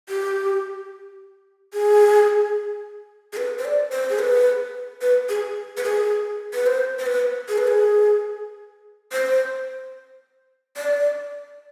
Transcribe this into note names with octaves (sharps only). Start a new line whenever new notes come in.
G4
G#4
G#4
B4
C5
D5
C5
G#4
B4
B4
G#4
B4
G#4
B4
C5
C5
B4
G#4
B4
G#4
C5
D5